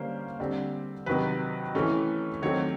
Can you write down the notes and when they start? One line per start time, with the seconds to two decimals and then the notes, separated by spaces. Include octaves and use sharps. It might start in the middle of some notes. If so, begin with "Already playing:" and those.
Already playing: D3 G3 A#3 C#4 C5
0.40 D3 G3 C4
1.06 C3 D#3 F#3 B4
1.75 E3 A3 C#4
2.42 D#3 F#3 A3 C4 C#5